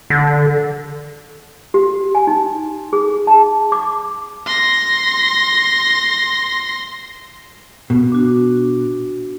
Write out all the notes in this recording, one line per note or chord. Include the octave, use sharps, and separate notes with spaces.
D3
G4
G#5
D#4
G#4
A5
D6
C6 A#6
B2
D4 F#4